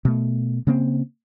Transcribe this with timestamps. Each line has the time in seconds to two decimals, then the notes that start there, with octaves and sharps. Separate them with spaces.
0.05 B2 A3
0.67 C#3 A#3 C4